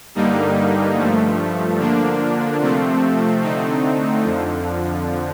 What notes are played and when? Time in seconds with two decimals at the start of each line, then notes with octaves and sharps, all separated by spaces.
0.15 G2 D3 G3 A#3 D#4
0.97 G2 F3 A3
1.79 D3 F3 A#3 D4
2.60 C3 F3 A3 C4
3.42 D3 A3 C4 D#4
4.23 F2 D3 F3